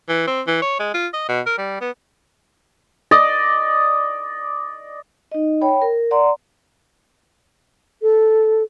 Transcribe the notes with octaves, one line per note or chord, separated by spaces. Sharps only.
E3
C4
E3
C#5
G#3
F4
D#5
B2
A#4
G3
B3
D5 D#5
D#4 D#5
C#5 G5 B5
A#4
D5 F#5 A#5 C6
A4